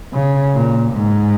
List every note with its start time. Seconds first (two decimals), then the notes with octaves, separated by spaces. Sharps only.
0.13 C#3
0.53 A#2
0.93 G#2